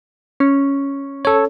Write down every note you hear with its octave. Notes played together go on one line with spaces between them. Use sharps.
C#4
A4 C#5